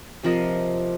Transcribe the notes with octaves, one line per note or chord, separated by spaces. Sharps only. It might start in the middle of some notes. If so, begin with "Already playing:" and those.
C3 F3 A#4 D#5